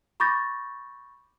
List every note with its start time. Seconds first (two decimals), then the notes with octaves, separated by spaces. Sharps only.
0.20 B5 C#6 D6 G6 A6 A#6